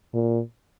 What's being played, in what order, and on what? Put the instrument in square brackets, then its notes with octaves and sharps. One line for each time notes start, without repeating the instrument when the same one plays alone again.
[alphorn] A#2